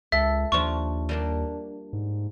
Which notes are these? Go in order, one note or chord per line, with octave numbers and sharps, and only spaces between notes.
C#2 A4 E5
D#2 F3 D4 F4 C#6
G3 A#3 D4
G#2